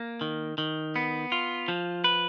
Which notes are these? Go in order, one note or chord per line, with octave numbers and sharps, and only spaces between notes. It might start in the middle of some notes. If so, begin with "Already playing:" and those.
Already playing: A#3
D#3
D#3
B3
F4
F3
B4